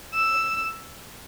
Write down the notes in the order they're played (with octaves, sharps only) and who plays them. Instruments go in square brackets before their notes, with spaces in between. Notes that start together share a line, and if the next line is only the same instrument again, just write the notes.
[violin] E6